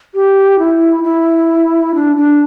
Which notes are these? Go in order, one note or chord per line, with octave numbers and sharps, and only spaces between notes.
G4
E4
E4
D4
D4